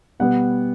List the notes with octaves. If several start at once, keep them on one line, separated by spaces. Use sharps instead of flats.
B2 G3 B3 F#5